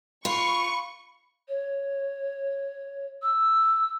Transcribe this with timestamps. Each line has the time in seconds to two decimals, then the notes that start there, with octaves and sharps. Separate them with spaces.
0.25 F4 B5 C#6
1.48 C#5
3.22 E6